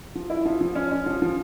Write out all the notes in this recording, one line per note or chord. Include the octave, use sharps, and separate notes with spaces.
F3
E4
F3
F3
C#4
C#4
F3
F3